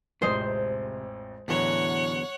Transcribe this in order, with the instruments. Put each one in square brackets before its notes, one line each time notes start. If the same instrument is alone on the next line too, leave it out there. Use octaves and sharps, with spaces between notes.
[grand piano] A1 F2 D#6 [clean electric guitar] C3 [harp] G#3 C5
[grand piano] A1 E3 [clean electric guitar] E2 D3 F#3 [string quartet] C#5 F#5